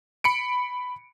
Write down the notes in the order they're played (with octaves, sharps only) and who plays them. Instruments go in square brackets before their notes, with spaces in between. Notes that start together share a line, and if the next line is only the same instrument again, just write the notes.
[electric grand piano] B5 C#7 D7